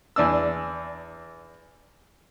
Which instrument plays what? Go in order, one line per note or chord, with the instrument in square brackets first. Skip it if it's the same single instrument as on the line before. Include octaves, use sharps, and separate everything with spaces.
[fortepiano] E2 D4 E6